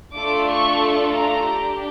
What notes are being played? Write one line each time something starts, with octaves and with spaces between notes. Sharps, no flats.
A3 D4 F4 A4 D6
C#6
A#5
D4 G4